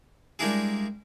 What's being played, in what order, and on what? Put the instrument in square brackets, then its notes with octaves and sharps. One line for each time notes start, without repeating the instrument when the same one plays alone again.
[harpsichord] G3 G#3 A#3 D4 E4 G#4